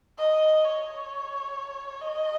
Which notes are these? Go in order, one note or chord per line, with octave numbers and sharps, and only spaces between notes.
D#5
C#5
D#5